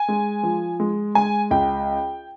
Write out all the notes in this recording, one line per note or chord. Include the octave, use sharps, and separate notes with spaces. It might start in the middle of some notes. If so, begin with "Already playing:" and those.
Already playing: G#5
G#3
F3
G#3
G#3 G#5
C#2 G5